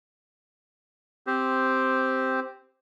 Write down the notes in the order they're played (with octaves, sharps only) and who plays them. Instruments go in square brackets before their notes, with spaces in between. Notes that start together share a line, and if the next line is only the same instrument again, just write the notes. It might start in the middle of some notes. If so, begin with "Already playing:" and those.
[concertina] C4 G4 C5